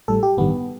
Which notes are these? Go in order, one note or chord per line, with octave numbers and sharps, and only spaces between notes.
A1 A2 G3 A4
G4
A1 G2 D#3 G3 B3